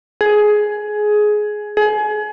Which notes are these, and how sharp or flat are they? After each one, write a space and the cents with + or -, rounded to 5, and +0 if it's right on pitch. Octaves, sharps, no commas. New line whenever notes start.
G#4 +15
G#4 +30